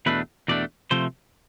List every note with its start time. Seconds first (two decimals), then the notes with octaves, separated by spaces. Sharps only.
0.06 E2 B2 A3 D4 B4
0.48 E2 B2 A3 D4 D5
0.91 C3 F3 A3 C5